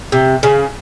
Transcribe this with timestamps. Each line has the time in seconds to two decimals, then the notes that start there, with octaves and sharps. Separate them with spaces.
0.12 C3
0.43 C#3